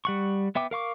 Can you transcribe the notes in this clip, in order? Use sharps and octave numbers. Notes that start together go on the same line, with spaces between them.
G3 F#5 C#6
B3 E5 G5 D6
A#4 F5 C#6 D6